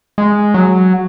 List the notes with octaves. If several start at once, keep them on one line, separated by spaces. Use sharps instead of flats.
G#3
F#3